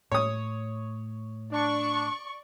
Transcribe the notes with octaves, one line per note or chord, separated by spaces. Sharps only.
A2 C#5 D#6
D4 D5 C#6